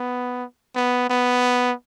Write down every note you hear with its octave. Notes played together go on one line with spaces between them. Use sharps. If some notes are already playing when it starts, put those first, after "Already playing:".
Already playing: B3
B3
B3